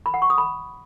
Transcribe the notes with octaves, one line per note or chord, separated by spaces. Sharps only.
B5
F#5
C#6
D#6
B5